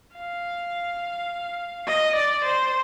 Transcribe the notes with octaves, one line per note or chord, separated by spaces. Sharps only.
F5
D#5
D5
C5